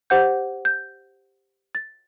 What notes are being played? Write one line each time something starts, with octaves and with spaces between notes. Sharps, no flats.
G4 C5 F#5 G6
G6
A6